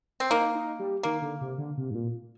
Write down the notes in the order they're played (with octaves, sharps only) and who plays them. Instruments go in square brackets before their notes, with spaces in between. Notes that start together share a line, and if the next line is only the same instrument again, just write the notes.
[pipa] C4
[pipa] A#3 [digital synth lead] D#4
[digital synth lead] D#4
G3
[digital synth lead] D#3 [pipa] A#3
[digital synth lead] D3
C3
D3
C3
G#2
A#2